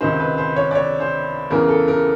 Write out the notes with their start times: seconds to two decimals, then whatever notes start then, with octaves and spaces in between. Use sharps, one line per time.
0.01 C#2 C3 D#3 C5
0.20 B4
0.38 C5
0.56 C#5
0.71 D5
0.75 C#5
1.00 C5
1.50 E2 C#3 E3 A#4
1.69 A4
1.88 A#4